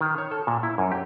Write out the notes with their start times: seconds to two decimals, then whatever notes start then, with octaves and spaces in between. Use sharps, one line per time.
0.01 D#3
0.18 C#5
0.31 A4
0.47 A#2
0.63 E4
0.78 F#2
0.92 G4